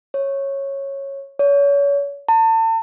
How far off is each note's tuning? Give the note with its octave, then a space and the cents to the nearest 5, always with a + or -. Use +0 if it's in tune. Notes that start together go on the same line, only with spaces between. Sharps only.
C#5 -10
C#5 +35
A5 +40